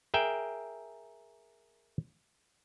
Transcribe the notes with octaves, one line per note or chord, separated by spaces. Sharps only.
G#4 A#4 E5 G5